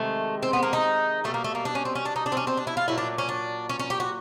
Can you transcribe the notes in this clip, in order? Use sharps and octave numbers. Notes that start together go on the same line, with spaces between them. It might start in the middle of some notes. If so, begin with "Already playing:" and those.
Already playing: C3 D#3 G#3 A3
C4
B3
A#3
D#4
B2 G3 A3
A#3
A3
A#3
D4
C#4
C4
C#4
D4
D#4
D4
C4
C#4
C4
D4
E4
F4
A#2 F#3 A3 E4
D4
C#4
D4
C#4
C#4
G4
F#4